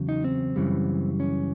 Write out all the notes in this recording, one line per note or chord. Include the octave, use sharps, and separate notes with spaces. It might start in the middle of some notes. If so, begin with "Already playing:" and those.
Already playing: E2 C#3 F#3
D#4
C4
F#2 C#3 E3 G3
C#4